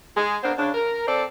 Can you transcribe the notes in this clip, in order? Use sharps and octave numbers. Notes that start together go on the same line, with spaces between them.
G#3 G#4
A#3 B3 D4 C5
C#3 D4
A#4
C4 A4 C5 D5